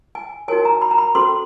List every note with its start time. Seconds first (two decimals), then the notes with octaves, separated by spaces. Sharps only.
0.15 G#5
0.48 D#4 F#4 A#4 C#5 G#5
0.65 A#5
0.82 B5
0.91 A#5
0.98 B5
1.15 C#4 F#4 A4 C5 C6